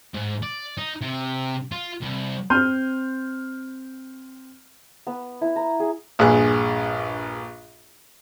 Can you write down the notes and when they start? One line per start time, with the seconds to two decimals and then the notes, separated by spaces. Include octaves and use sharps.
0.14 G#2
0.43 D5
0.78 D#4
1.01 C3
1.72 F4
2.01 C2
2.50 C4 C6 F6 G6 D#7
5.07 B3
5.41 E4
5.56 A#5
5.80 G#4
6.19 A#1 G2 G#4 F#6